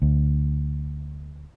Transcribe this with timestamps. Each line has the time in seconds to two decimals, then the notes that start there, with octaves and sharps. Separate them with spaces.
0.02 D2